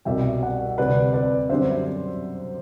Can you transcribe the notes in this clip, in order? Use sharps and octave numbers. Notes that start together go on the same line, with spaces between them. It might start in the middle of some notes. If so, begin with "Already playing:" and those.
C2 B2 G3 E5 G5
D5 F#5
D2 C3 G3 B4 D5
B4 D5
F#2 D3 G3 C5 E5